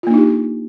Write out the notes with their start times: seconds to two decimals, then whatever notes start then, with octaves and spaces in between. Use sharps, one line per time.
0.03 F4
0.07 A#3
0.10 D4
0.14 D#4
0.18 G4